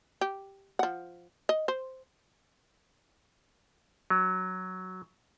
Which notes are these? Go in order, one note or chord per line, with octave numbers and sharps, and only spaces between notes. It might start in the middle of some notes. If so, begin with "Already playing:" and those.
G4
F3 F#5
D#5
C5
F#3